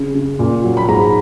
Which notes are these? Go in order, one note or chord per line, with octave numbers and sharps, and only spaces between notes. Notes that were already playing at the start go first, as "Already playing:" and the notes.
Already playing: C#3
C#3
A#2
F#3
B5
G#2 A#5